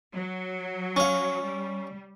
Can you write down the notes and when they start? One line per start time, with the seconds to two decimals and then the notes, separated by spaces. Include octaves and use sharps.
0.14 F#3
0.96 C#4 F5
1.41 G3